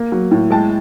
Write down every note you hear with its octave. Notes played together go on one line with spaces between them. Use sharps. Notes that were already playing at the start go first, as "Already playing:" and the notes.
Already playing: A#3
F#3
A2
G#3 G5 A5